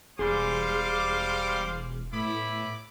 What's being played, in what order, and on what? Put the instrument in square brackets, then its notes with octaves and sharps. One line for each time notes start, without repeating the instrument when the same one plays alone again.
[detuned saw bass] E1 [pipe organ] G3 C6 [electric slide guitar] G#4 [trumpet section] C5 F5 D6
[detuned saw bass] A2 [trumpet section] B3 E4 B5 [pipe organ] D6